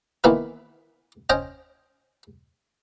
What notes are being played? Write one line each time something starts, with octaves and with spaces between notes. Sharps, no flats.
D#3 E3 A#3 B3 E4 F4
C#4 C5 C#5 D#5 G5